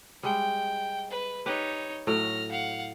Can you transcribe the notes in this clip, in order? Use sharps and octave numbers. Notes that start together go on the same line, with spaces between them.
G3 G#3 G5
B4
D#4 G4 B4 C#5
A2 F#3 F6 A#6
F5 F#5